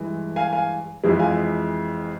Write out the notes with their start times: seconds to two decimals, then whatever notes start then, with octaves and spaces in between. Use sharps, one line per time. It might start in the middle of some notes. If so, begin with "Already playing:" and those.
Already playing: G2 E3 G#3
0.36 F5 G#5
0.53 F5 G#5
1.04 F2 E3 G#3
1.19 F5 G#5